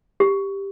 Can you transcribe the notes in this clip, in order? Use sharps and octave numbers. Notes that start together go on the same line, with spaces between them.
G4